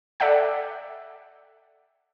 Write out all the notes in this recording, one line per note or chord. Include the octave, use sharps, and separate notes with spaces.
A4 D5 E5 F#5 G5